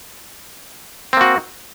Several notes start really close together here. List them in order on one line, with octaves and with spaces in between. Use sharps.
C4 A#3 F#4